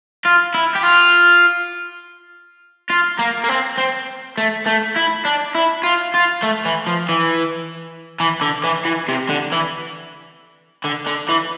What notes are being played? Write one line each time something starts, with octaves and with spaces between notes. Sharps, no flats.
F4
E4
G4
F4
F4
A#3
A#3
C4
C4
A3
A3
E4
D4
E4
F4
F4
A3
E3
F3
E3
E3
D3
E3
E3
C3
D3
E3
D3
D3
E3